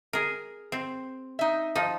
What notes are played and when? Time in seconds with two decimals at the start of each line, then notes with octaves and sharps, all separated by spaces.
0.13 G#4 A#4
0.72 C4
1.39 D#4 E5
1.75 F3 D#4